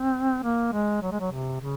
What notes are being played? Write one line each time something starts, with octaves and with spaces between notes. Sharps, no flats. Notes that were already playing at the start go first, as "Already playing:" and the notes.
Already playing: C4
A#3
G#3
F#3
G#3
F#3
C3
C#3